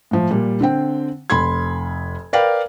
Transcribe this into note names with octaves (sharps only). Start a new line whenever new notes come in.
A2 F3
A#2 G3
D3 C4 G5
F1 B5 C6 G#6
A#4 B4 D5 F5 G5